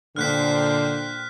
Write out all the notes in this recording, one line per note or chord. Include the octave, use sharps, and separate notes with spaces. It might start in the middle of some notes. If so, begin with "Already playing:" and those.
A#2 D3 C5 G5 F6 F#6 B6